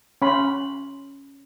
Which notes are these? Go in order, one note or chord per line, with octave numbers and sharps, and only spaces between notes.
C#4 B5 C6